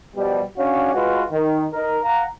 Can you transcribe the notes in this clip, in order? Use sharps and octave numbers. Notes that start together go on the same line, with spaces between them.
B2 F3 G3
C#4 D4 F#4 C#5 F5
G#3 F4 F#4 B4
D#3
D#4 A#4
F5 F#5 A#5